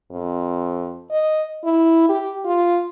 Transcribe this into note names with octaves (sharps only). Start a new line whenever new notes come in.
F2
D#5
E4
G4
F4